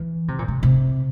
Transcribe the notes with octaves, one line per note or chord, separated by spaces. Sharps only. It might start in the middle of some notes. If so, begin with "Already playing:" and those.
Already playing: E3
C3
A#2
C3
C3